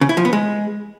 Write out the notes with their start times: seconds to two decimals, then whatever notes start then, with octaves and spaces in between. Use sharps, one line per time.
0.01 C#3
0.09 E4
0.17 F3
0.25 B3
0.33 G#3